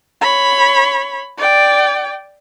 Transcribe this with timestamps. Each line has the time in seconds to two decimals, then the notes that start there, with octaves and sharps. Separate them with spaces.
0.21 C#5 B5
1.38 D5 G5